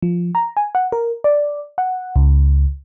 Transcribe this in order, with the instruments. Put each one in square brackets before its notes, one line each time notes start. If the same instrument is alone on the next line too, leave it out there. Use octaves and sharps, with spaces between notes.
[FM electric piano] F3
A#5
G#5
F#5
A#4
D5
F#5
C#2